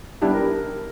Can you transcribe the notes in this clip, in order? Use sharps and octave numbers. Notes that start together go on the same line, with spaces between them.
G3 B3 D4 E4 G4
A#4